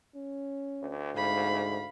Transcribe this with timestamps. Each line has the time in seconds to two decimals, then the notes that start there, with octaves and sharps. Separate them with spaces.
0.16 C#4
0.82 D2
1.15 G#2 F5 B5